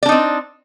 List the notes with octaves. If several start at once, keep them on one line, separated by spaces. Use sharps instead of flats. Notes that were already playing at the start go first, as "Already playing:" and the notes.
C4 D4 D#4 D5